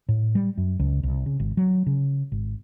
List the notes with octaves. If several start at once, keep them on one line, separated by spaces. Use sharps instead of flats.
A2
G3
F#2
C#2
C2
C#3
G#1
F#3
C#3
G#1